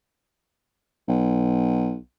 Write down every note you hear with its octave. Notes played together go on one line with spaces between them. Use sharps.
B1